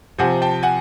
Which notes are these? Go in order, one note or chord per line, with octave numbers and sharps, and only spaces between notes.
C3 F3 F#5 G#5
G5 A5
F#5 G#5